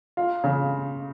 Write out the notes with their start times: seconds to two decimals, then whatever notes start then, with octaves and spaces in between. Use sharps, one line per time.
0.17 F4
0.44 C#3